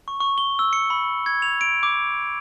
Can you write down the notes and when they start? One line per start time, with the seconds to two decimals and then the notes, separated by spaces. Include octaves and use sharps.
0.08 C#6
0.20 C#6
0.38 G7
0.59 E6
0.73 C#7
0.90 B5
1.26 G#6
1.42 F7
1.61 D7
1.83 D6